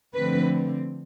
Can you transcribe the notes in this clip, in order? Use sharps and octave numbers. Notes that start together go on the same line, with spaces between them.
D3 F3 A3 C4 B4